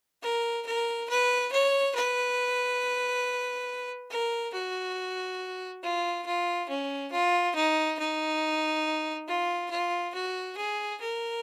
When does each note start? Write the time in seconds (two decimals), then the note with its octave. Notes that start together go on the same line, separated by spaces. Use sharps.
0.22 A#4
0.67 A#4
1.09 B4
1.52 C#5
1.95 B4
4.10 A#4
4.53 F#4
5.83 F4
6.26 F4
6.69 C#4
7.12 F4
7.55 D#4
7.99 D#4
9.28 F4
9.70 F4
10.14 F#4
10.57 G#4
11.00 A#4